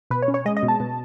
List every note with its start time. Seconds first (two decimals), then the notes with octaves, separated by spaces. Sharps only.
0.11 B2 B4
0.22 C#5
0.28 C#4
0.34 C#5
0.46 G#3 D#5
0.57 D#5
0.63 B2
0.68 A5
0.80 B2